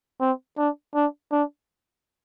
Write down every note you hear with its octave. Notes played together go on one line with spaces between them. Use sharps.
C4
D4
D4
D4